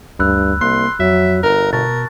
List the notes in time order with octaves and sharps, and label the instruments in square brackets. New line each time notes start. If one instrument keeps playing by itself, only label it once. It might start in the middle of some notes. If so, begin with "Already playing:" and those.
[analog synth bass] D2 [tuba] G2 [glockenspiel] B5 E6 F#6
[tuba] C2 [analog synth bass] A#3 [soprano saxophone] C6 [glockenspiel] F#6
[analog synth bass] F2 [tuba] F#3 [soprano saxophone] E5
[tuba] G1 [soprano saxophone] A#4
[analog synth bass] B2 [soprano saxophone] A#4 [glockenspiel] A5 C#6 A6